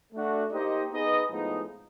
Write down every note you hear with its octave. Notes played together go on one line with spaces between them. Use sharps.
A3 D4 F#4
A#3 D#4 G4 C5 D#5
B3 D#4 G#4 B4 D#5
A2 F3 G#3 B3 D#4